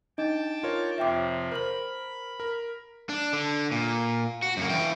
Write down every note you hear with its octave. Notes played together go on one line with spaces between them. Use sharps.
D4 D#4 D#5 G5 A5 D6
F4 A#4 C#5
F2 C3 F3 E5 G5 D6
A#4 C5 B5 F#7
A#4
D4
D3
A#2
F#4
F#2 A#3
E3 G5